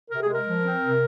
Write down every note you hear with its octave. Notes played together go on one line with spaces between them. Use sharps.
C3 A#4
G#4
G#3 A#4
F3
C4
C3